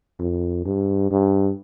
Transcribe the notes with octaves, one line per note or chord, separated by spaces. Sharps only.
F2
G2
G2